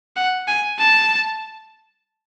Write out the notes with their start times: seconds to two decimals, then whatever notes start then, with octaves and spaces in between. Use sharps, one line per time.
0.16 F#5
0.48 G#5
0.79 A5